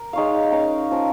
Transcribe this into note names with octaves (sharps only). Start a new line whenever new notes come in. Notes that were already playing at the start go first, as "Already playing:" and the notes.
Already playing: A#4
G#3 D#4 C#5 F5
C#4 A#4 F5
F3 C#4 A#4